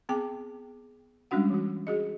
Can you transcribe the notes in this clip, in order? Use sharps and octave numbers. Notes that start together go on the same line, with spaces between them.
B3 C4 G#4 G5 D6
G3 G#3 C#4 D4 F#4 F#5
E3 F#4
F#4 G#4 D#5